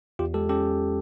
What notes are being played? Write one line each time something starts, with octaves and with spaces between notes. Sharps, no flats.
E2 F4 G4
G#3 G4 A4
C#4 G4 A4